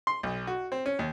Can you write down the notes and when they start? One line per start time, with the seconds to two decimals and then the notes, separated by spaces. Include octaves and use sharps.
0.07 C6
0.23 B1
0.47 F#4
0.72 C4
0.86 C#4
0.99 D#2